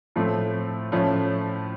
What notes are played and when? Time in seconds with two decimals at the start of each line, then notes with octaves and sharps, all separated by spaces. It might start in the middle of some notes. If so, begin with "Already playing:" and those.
0.16 A2 F3 A3 C4
0.92 A2 F3 A3 C#4